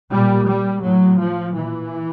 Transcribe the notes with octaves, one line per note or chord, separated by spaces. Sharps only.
A#2 G3
G3
A2 F#3
F3
A#2 E3